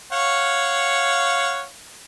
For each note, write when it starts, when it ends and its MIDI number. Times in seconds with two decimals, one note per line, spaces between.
0.12 1.65 73
0.12 1.65 77
0.12 1.65 78